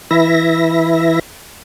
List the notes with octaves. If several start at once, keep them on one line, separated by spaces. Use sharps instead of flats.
E3 E4 E5 A#6